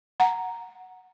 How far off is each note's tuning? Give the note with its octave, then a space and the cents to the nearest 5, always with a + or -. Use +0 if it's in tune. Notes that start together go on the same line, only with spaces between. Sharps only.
F#5 +0 A#5 +0